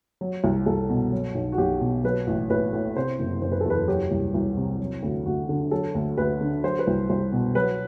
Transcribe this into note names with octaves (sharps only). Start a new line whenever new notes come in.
F#3
C2
C2 A4
B2
F#3
B1
F#4
B1 G4
B2
F#3 B4
A1
A1 B4
A2
C3 C5
F#1
F#1 C5
B4
A4
E2 B4
F#3 G4
C2
C2
C3
F#3
D2
D2 F#4
D3
F#3 A4
D2
D2 B4
D3
F#3 C5
B4
C2
C2 C5
B2
F#3 B4